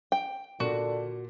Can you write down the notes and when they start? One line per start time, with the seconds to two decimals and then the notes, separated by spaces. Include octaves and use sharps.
0.12 G5
0.60 A#2 D3 F#4